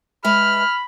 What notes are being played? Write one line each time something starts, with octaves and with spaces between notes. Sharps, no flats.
G#3 B4 E5 B5 F6